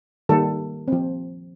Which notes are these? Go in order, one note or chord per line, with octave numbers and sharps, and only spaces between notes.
D#3 G3 A#3 A4
F3 C4